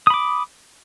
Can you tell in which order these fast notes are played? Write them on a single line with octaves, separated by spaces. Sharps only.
D#6 B5 D6